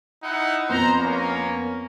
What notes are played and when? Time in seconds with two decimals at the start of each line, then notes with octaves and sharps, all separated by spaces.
0.24 D#4 E4 F#5
0.70 F2 B3 C5 A#5
1.00 A#3 C#4 A#4